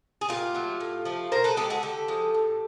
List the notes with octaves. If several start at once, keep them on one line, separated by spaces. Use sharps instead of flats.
G#4
A#2 F4 G4
F#3 A3
A2
F3 A3
B2 A#4 C5
A4 B4
G#3 G4 A4
F#4 G#4
D3 G4 A4
F3 G#3
A2